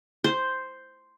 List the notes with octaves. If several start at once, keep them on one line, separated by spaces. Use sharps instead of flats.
C5